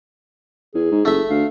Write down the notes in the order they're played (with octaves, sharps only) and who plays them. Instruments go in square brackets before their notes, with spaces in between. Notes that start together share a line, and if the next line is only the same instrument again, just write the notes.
[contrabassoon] E2 [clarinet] G#4
[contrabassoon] G#2
[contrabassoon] F#1 [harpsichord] A3 E5
[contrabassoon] D2 [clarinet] F5